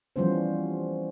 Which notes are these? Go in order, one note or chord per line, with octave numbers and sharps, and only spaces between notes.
E3 F3 G3 B3 C#4 C5